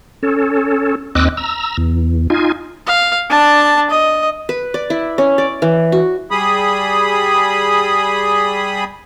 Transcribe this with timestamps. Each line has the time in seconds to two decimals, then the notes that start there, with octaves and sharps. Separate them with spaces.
0.23 C#4 A4
1.15 D#2 C4 D#5 D6 E6 F#6
1.37 A#5 E6
1.77 E2
2.30 D#4 F4 G#5
2.86 F5
3.30 D4 A5
3.90 D#5
4.49 B4
4.74 D5
4.90 E4
5.18 C#4
5.38 D5
5.62 E3
5.92 F#4
6.31 G3 G#4 B5 D#6